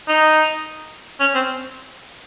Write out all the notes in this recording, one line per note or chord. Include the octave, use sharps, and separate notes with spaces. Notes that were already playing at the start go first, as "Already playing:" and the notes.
D#4
C#4
C4